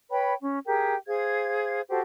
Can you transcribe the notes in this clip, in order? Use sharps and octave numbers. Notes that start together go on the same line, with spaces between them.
B4 C#5 G5 B5
C#4
G4 G#4 A#4 G5
G#4 C5 F5 G#6
F#4 G4 A4 C5